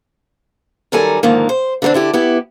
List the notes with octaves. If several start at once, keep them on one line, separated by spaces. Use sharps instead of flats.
F#2 D#3 G3 A4 A#4 G#5
G#2 D3 D#3 F3 A#3
C5
D3 E3 A3 C4 D4
D3 E4 G4
B3 E4 G4